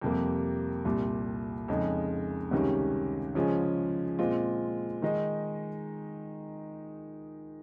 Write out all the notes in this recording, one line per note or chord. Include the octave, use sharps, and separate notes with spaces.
F2 C3 G3 A#3
C2 A#2 G3
F2 C#3 G#3 D#4
C#2 C3 D#3 G3 C#4
C#3 F3 G#3 C#4
A#2 G#3 C4 F4
D#3 G#3 D#4